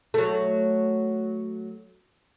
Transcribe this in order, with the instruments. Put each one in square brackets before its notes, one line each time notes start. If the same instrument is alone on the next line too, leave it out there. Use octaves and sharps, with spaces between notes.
[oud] F#3 A3